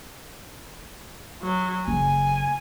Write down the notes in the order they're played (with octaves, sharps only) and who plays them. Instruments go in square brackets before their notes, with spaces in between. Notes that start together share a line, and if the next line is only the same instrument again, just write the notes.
[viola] F#3
[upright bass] F#1 [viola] G#5